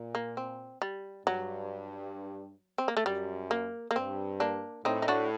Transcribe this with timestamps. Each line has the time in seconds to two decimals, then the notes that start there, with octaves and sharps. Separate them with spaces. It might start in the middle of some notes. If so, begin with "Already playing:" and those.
Already playing: A#2
0.15 A#3
0.37 C4
0.82 G3
1.26 G2 F#3
2.78 C4
2.88 A#3
2.97 A3
3.06 F#2 G3
3.51 A#3
3.91 A#3
3.96 G2 C4
4.40 A#3 D4
4.85 A2 C4 D#4
5.02 D#4
5.08 D4 F#4